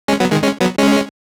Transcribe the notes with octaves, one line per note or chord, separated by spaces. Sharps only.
G#3 C#4
F#3 B3
D#3 G#3
G#3 C#4
F#3 B3
G#3 C#4